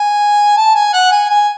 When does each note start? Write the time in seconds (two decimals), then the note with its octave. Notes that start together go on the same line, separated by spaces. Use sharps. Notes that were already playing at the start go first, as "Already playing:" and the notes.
Already playing: G#5
0.57 A5
0.75 G#5
0.93 F#5
1.11 G#5
1.30 G#5